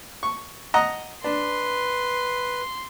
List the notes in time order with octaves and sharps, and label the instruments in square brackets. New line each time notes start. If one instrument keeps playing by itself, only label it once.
[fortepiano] C#6
D#5 F#5 A#5
[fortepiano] D4 [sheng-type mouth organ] B4 [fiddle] C6